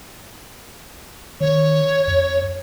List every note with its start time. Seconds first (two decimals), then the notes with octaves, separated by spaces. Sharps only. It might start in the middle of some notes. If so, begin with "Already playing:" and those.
1.41 D#3 C#5
2.08 F2